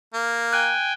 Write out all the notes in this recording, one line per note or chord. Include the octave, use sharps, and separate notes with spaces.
A#3
G5 G#5 F#6